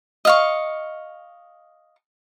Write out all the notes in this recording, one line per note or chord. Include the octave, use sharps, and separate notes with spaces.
D#5 F5 C#6